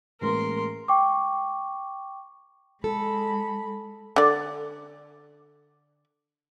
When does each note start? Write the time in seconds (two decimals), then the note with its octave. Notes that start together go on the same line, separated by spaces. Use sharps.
0.21 A1 G#3 A#3 A#4 C6
0.88 G5 C#6 D6
2.84 G#3 A4 B5
4.16 D3 D5